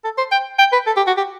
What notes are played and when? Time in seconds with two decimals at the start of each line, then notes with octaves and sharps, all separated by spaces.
0.04 A4
0.18 C5
0.32 G5
0.59 G5
0.73 B4
0.87 A4
0.97 G4
1.07 F#4
1.17 G4